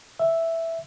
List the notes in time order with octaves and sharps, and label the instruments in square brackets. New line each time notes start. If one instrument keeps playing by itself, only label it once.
[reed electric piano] E5